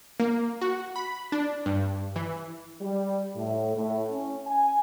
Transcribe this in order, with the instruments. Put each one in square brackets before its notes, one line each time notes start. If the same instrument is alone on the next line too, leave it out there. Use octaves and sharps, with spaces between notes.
[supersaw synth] A#3
F#4
B5
D4
G2
E3
[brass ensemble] G3
A2
A2
C#4
G#5